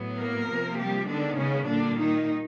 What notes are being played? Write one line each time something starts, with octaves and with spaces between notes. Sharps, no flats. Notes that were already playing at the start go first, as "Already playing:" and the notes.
Already playing: A2 F#3 B3
A#3 A#4
C3 F3 A#3
G3 G4
D3 D#3 G#3 B3 D4
C#3 C#4
A#2 D3 G3 A#3 D4
D#3 D#4